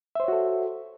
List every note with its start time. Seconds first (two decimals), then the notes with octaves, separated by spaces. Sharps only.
0.15 E5
0.20 C5
0.24 C#5
0.28 F#4
0.32 A4